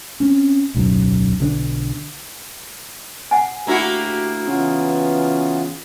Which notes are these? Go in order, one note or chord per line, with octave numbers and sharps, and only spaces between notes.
C4 C#4
D1 B1 F#2
B1 D3 A3 D4
F#5 G#5
D2 A#3 E4 F#4 G4
C#3 E3 B3 F4